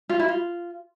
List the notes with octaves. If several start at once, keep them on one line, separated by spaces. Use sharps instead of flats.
F4
E4
F4